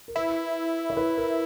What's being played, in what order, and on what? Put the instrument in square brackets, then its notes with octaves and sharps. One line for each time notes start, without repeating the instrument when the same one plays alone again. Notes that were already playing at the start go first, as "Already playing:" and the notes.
[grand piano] A#4
[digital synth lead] E4 [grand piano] B4
[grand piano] C#5
B4
A#4